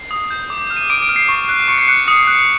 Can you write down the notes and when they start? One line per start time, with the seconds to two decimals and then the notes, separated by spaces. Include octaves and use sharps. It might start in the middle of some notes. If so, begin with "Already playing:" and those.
Already playing: C7
0.11 D#6
0.31 G6
0.50 D6
0.70 F6
0.76 D#7
0.90 D6 D7
1.02 D7
1.09 F6
1.16 C7
1.28 C#6
1.49 F#6
1.68 C#6 C#7
1.78 C7
1.88 F#6 C#7
2.08 D#6 C#7
2.27 F#6